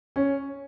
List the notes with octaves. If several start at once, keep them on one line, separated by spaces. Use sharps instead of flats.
C#4